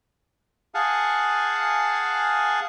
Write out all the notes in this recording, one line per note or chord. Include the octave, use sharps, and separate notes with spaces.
G#4 F5 F#5 G#5 A5